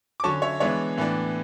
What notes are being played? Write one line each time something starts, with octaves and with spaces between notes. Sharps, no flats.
D6
D3 F#3 C#4 A5 C#6
C#5 E5
E3 G#3 B3 D4 C#5 E5
A2 E3 B3 D4